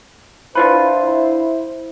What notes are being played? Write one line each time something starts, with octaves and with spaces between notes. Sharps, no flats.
D3 E4 F4 B4 C5